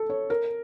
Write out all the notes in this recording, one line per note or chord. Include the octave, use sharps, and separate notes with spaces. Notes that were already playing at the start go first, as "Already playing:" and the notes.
Already playing: A4
C#5
A#4